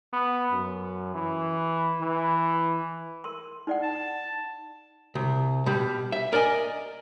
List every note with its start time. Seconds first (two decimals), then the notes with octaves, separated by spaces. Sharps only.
0.13 B3
0.52 F#2
1.15 E3
2.01 E3
3.24 A#4 C6
3.67 D#4 D5 F#5
3.83 A5
5.15 C2
5.66 B2 G3
6.12 E5
6.33 A#4 D5 D#5 G#5